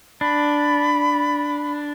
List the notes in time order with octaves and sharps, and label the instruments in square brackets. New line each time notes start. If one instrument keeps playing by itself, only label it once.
[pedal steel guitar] D4 [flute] B5